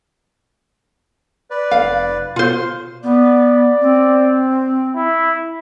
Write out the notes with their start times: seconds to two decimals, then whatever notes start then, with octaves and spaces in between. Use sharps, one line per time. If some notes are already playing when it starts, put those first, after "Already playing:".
1.50 B4 D5
1.71 F1 F5
2.36 B2 F4 C5
3.03 B3 D5
3.81 C4
4.95 E4